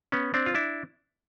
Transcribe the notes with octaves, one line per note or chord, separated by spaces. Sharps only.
B3 C#4
C4 D4
F4
D4 E4